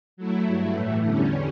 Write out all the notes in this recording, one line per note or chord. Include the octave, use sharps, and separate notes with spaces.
F#3 A3 E4
G2 F#3 A3 E4
A2 E3 A3
E2 D3 G3 C#4